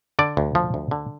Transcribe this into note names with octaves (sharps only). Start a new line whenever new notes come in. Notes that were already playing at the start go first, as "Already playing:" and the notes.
D3 D5
D2
F3
D2
D3